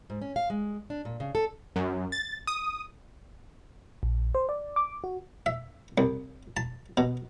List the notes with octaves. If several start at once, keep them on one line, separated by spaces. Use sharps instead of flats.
G#2
C#4
F5
G#3
D4
A#2
C#3
A4
F#2
A6
D#6
A#1
C5
D5
D6
F#4
E5
C2
A5
B2